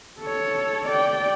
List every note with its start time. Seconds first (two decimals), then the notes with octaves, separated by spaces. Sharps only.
0.20 A4 C#5
0.86 D5 G5